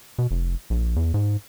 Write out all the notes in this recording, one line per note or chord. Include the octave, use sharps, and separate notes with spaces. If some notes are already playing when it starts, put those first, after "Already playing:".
B2
F1
A#1
E2
G#2